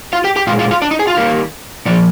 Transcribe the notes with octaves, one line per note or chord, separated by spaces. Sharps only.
F4 F5
G4 G5
G4 G5
A#2 G#3 F4 F5
F4 F5
F4 F5
D4 D5
D#4 D#5
G#4 G#5
F4 F5
D#3 G3 A#3
A#2 F3 D5